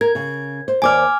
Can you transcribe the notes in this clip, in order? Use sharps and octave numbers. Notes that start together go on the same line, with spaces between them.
A#4 G#6
C#3
C5
D#2 C5 D5 G#5 D6 F6